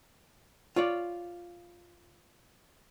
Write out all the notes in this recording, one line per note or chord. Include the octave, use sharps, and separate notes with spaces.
F4 C#5 D5